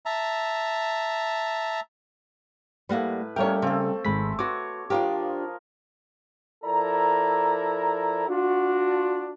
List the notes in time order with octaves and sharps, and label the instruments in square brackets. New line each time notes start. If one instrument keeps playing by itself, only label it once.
[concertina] E5 A5 A#5
[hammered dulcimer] A2 B4 [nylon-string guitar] G3 A#3 F#5
[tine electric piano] G3 G5 [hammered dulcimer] A3 A#3 C#4 [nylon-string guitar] A#4 C#5
[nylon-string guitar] C#3 [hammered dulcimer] C4 A4
[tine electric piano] G#1 B5 B6 [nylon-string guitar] G#3
[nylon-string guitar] B3 F#4 [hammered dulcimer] C#5 [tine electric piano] D6
[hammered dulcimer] F3 A#4 [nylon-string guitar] D4 F4 G4
[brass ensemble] F3 E4 A4 A#4 D5 A#5
D4 F4 F#4